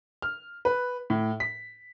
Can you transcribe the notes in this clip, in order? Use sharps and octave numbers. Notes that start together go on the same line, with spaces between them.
F6
B4
A2
B6